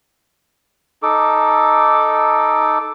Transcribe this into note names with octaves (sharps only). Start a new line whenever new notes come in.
D#4 A4 D6